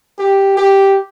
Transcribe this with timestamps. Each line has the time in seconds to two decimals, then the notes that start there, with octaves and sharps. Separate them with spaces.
0.18 G4
0.56 G4